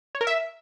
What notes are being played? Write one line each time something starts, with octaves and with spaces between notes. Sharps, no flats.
C#5
A#4
E5